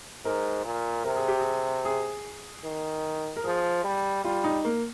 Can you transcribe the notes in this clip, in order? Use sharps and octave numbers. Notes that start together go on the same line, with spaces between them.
G#2 A#4
A#2
C3 A#4
G#4
G4
G#4
G#4
D#3
A#4
F3 G#4
G3
G3 F4
D#4
A#3